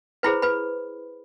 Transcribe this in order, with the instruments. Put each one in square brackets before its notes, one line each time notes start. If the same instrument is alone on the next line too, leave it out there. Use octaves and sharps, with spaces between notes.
[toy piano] E4 G#4 B4 C5 B5
B4 B5